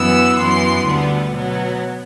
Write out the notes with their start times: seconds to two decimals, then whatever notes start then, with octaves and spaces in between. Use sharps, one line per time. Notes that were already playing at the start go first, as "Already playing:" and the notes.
Already playing: F#2 E3 B3 E6
0.38 F#2 E3 B3 C6
0.86 D2 D3 G3 B3
1.33 B2 F#3 B3